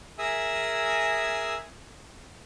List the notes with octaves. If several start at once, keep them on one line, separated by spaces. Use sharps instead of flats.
G#4 A#4 E5 G#5 D#6 E6